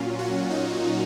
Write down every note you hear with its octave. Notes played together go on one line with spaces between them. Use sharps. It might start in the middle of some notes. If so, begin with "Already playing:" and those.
Already playing: A#2 F#3 C#4 F4
F#4
D#4